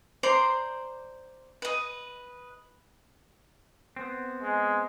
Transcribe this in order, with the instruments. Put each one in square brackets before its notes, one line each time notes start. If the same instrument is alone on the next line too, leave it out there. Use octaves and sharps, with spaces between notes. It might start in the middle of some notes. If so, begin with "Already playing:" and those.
[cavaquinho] C5 D5 A#5 C6
B4 D#5
[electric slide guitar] B3 C4
[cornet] G#3